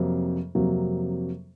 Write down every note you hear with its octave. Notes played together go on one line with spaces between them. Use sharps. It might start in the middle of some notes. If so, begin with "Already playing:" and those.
Already playing: F2 C3 F#3 A#3
F2 C3 F#3 A#3